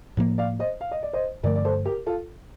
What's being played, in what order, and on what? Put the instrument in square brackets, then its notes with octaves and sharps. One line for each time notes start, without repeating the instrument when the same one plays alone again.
[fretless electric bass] A2 F3 A#3
[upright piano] D5 F5
C5 D#5
F5
D#5
D5
C5 D#5
[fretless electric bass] G2 D3 F3 A3 [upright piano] A#4 D5
[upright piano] D5
A4 C5
G4 A#4
F4 A4